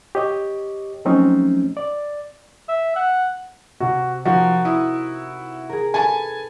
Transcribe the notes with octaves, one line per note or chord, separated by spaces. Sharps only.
G4 C#5 D#5
F3 F#3 A3 C4 C#4 D#4
D5
E5
F#5
C3 F#4 E6
F3 D#4 F#4 A#4
E4 D#6
G#4 A#4
A4 B4 G#5 A5